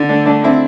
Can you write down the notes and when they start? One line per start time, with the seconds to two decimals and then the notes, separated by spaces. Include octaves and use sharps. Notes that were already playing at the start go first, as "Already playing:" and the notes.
Already playing: D3
0.09 A3 D4
0.26 A3 D4
0.44 C4 E4